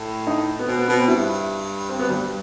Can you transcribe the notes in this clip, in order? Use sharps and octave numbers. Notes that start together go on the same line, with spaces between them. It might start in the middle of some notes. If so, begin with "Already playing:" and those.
Already playing: A2
D#4
B3
B2 C4
B3
B2 B3
C4
G2 E4
C4
B3
G3